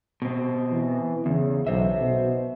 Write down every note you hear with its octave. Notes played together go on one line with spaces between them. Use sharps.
B2 C4
E3
E2 C#3
B1 C5 E5
B2